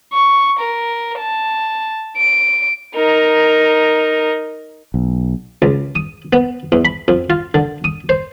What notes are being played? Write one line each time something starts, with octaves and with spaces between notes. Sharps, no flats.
C#6
A#4
A5
D7
D#4 A#4
B1
C#2
D#6
B3
E2
B5
F2
F4
D3
D#6
C5